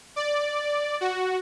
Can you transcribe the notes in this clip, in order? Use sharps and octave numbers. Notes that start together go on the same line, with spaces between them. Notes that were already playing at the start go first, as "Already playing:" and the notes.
D5
F#4